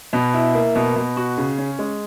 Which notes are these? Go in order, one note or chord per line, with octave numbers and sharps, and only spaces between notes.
B2
E4
A#3
B2
B2
F#4
C#3
C#4
G#3